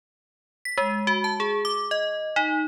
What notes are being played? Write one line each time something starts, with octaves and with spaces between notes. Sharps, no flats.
B6
G#3
F#4
A5
G#4
D6
D#5
D#4